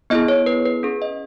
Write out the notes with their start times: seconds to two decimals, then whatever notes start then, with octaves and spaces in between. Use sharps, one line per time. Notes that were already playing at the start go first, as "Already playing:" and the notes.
0.10 B3 E4 G#4 D#5
0.28 C#5
0.46 B4
0.66 B4
0.83 C#4 G#4
1.02 D#5